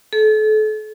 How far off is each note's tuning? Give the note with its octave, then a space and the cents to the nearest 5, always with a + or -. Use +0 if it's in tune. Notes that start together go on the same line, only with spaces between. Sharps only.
A4 -35